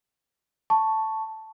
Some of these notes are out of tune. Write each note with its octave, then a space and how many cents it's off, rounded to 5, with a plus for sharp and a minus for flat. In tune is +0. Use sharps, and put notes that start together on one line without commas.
A5 +0 C#6 +0